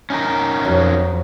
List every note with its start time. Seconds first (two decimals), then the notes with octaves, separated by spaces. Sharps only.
0.10 C#4 D#4 A#4
0.65 F2 F#3